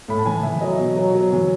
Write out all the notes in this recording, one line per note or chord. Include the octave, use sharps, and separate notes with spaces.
A2 B5
A5
E3 G#5
E3 E5
F#3 D#5
B2
F#3
F#3
E3